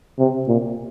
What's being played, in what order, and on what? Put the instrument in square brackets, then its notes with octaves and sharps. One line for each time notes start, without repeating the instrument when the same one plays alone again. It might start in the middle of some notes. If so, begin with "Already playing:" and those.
[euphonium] C3
A#2